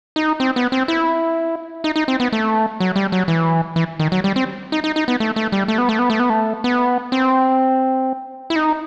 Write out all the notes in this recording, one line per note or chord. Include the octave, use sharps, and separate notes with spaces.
D#4
C4
B3
C4
E4
D#4
D#4
C4
B3
A3
F#3
G3
F#3
E3
E3
D#3
F#3
G3
C4
D#4
D#4
D#4
B3
A3
A3
G3
A3
B3
A3
B3
A3
B3
A3
B3
C4
E4
D#4